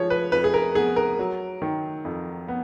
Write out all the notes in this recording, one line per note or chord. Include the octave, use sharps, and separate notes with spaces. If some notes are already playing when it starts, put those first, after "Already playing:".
Already playing: F3 G#3 G#4 C#5
B4
F2 B4
G#4
A#4
B3 G#4
A#4
F#3
D#3
F2
B3